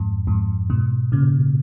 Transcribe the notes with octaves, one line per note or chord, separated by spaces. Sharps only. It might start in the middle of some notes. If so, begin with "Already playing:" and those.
Already playing: F2 G#2
F2 G#2
G#2 B2
A#2 C#3